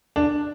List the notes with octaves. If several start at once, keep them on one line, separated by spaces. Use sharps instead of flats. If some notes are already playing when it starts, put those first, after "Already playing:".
D4